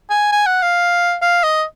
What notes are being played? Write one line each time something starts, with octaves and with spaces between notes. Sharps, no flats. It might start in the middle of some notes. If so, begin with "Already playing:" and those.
G#5
G#5
F#5
F5
F5
D#5